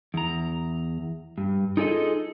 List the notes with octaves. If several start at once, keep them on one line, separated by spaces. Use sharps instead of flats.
E2 A#5
G2
D#4 F4 G#4 A4 C#5 D#5